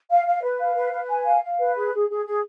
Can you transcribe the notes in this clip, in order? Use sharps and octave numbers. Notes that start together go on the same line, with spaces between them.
F5
F5
B4
F5
B4
B4
G#5
F5
F5
B4
G#4
G#4
G#4
G#4